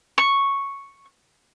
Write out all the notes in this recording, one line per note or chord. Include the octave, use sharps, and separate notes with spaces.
C#6